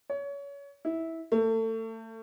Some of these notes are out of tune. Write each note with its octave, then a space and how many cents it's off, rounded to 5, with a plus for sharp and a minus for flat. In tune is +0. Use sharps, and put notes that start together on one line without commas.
C#5 +25
E4 -15
A3 +30